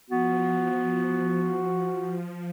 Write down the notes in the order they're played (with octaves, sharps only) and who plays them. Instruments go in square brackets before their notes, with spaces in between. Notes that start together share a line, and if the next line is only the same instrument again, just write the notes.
[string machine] F3 [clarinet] B3 [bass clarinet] F#4